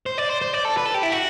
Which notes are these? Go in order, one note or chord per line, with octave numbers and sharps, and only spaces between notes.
C5
D5
C5
C5
D5
A4
B4
A4
G4
E4
F#4